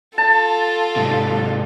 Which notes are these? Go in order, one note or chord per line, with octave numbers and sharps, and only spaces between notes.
F4 A4 A5
G#2 C3